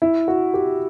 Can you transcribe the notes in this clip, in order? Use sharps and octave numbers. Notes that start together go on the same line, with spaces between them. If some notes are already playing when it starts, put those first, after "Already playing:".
E4
F#4
G4